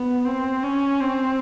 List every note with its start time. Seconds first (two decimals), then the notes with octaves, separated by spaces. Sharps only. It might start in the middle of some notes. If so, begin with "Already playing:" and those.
Already playing: B3
0.25 C4
0.63 C#4
1.01 C4